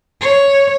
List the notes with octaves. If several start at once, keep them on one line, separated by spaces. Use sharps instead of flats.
C#5